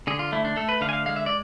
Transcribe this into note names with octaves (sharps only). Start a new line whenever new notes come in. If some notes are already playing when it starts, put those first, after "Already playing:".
D3 G#4
F4
A3 E4
D4
A3 A4
B4
D3 F5
G#5
F5
G#3 F5
E5
D5